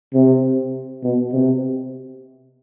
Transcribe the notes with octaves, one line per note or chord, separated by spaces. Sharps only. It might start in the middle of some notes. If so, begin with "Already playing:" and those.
C3
B2
C3